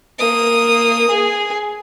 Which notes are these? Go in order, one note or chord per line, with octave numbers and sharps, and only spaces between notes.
A#3 D#6
G#4